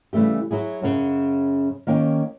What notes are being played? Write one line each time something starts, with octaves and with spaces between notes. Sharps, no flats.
C#3 E3 G3 A3 G4
F#3 E4 G#4
F#2 C#3
D#3 A#3 C#4 G5